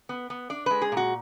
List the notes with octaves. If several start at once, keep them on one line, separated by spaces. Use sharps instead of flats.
B3
B3
D4 D5
G#3 B4
G#4
A#2 F#4